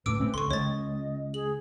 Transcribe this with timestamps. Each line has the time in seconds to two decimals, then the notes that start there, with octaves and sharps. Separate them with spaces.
0.06 C#2 A2 B4 D6 E6 D7
0.20 A3 C4 C#4
0.34 C#2 A4 C6 C#6
0.51 C#2 C#5 D#5 A6
1.34 G#4 F#7